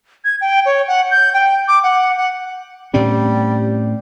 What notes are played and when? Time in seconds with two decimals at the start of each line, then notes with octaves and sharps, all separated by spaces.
0.24 G#6
0.41 G5
0.66 C#5
0.88 F#5
1.11 G6
1.34 G5
1.68 D6
1.83 F#5
2.17 F#5
2.94 A2 G3 C4 C#4